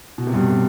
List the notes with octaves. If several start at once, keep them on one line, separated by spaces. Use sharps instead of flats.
B2
C3
G2 B2
C3